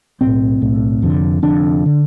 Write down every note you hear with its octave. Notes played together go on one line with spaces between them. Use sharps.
B1 A2 C4
B1 A2
F1 F2 D3
F1 F2 D3 D4
D3